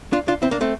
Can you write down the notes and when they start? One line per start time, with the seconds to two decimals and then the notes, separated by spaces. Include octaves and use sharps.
0.13 D4 F4
0.28 D4 F4
0.42 C4 E4
0.51 A#3 D4
0.61 A3 C4